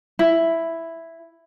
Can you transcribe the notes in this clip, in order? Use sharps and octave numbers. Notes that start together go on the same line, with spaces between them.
E4